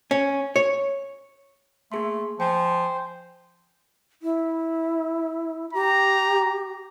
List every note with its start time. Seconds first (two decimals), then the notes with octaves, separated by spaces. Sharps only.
0.11 C#4
0.56 C#5
1.92 A3 A#3 G#4 C6
2.40 F3 C5 G5 G#5
4.22 E4
5.73 G4 A#5